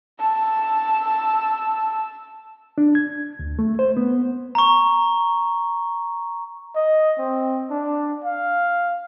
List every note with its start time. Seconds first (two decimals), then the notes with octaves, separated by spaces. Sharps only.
0.20 A5 E6
2.78 D4
2.95 G#6
3.39 D2
3.59 A3
3.79 C5
3.97 B3
4.55 A#5 C#6
6.75 D#5
7.19 C4
7.70 D4
8.24 F5